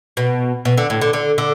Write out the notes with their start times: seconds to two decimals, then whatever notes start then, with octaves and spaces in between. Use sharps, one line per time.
0.17 B2
0.65 B2
0.78 D3
0.90 A2
1.01 D3
1.13 D3
1.38 D3